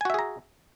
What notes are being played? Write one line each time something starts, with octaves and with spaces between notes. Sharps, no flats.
F#4 G#4 E5 G#5 A#5